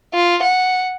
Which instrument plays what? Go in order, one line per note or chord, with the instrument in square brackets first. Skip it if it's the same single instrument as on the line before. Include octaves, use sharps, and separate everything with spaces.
[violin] F4
F#5